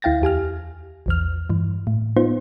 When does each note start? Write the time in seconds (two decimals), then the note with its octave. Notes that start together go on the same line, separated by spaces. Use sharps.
0.02 D2 E4 F5 G5 A6 A#6
0.22 E2 G4 G#5 F6
1.06 A#1 E2 F6
1.50 G2 E3
1.87 A2
2.17 B3 D#4 F4 C5